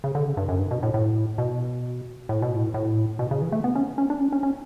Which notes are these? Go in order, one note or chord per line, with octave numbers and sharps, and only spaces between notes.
C#3
D3
C#3
G2
F#2
G2
B2
A2
A2
B2
A2
B2
A2
A2
B2
C#3
E3
A3
B3
C#4
C#4
D4
C#4
C#4
C#4